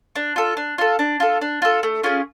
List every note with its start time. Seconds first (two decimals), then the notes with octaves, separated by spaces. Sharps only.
0.16 D4
0.36 F4 A4
0.57 D4
0.78 F4 A4
0.99 D4
1.20 F4 A4
1.41 D4
1.62 F4 A4
1.83 A3
2.03 C#4 F4 G#4